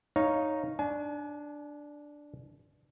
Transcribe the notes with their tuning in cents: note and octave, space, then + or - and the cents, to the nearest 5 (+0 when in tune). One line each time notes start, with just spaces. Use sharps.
D#4 +0 C#5 +0 F5 -5
D4 +0 G#5 +40